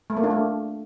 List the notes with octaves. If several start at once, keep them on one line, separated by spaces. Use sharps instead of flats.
A3
A#3
D4
A3